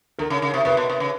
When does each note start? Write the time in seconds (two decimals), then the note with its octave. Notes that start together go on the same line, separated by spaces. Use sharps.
0.18 D3 A#4
0.30 C#3
0.42 C#3
0.54 C3
0.65 C3 B4
0.77 B2
0.90 C3
1.00 C#3